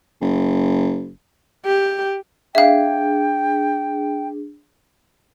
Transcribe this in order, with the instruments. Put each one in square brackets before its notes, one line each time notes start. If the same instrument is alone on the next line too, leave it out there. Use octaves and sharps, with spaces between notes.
[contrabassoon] F#1
[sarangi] G4
[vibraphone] D4 G#4 [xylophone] E5 F5 [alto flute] G5